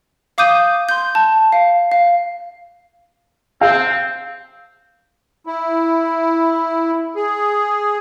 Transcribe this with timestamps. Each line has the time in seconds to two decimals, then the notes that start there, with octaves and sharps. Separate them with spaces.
0.38 F5 D6 D#6 G6 D#7
0.89 C6 G6
1.15 A5
1.52 F5
1.92 F5
3.61 C4 F5
5.47 E4
7.16 G#4